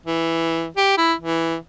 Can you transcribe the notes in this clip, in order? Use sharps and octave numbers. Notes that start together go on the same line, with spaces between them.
E3
G4
E4
E3